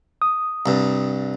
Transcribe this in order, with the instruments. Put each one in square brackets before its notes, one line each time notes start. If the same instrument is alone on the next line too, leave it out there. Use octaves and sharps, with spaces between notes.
[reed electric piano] D#6
[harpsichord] C2 G2